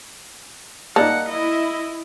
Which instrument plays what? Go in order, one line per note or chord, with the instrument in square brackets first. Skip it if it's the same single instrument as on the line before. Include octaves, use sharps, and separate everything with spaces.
[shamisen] A#3 [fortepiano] D#4 D5 A5 [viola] F#5
[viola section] E4 [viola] D#5